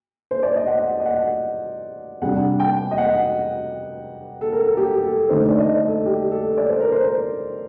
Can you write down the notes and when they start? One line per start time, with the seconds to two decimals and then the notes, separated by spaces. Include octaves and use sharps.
0.31 C5
0.43 D5
0.56 D#5
0.67 F#5
1.00 D#5
1.06 F#5
2.22 C3 G3 D4 F#5
2.60 G5
2.91 D#5
2.98 F#5
4.41 A4
4.52 A#4
4.66 A4
4.77 G4
5.03 A4
5.29 D3 A3 D#4 C5
5.48 D5
5.59 D#5
5.68 D5
5.87 A4
6.06 G4
6.31 A4
6.57 D5
6.69 C5
6.80 A#4
6.92 C5